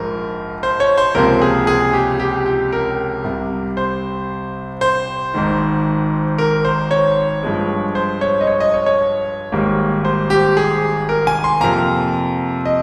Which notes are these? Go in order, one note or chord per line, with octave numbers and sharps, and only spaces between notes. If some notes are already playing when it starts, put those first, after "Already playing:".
Already playing: A#1 G#2 F3 A#4
C5
C#5
C5
C#2 C3 F3 A#3 A#4
G#4
G#4
G4
G4
G4
A#4
C2 C3 G3
C5
C5
G#1 G#2 D#3
A#4
C5
C#5
G2 F3 G#3
C5
C#5
D#5
C#5
D#5
C#5
C#5
G#1 G#2 G3 A#3
C5
G4
G#4
A#4
G#5
C6
F2 C3 F3 A#3 A#5
D#5